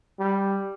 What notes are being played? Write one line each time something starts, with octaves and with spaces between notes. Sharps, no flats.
G3